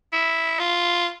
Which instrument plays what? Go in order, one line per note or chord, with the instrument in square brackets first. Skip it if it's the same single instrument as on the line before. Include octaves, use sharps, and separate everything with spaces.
[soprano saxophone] E4
F4